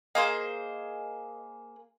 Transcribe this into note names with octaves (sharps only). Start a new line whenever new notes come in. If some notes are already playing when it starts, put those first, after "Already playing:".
A#3 G#4 A#4 C5 D#5